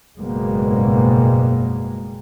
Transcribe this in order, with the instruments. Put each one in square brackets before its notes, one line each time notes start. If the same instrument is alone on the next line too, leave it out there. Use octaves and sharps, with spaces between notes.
[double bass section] F#1 G#2 B2 G3 G#3 A#3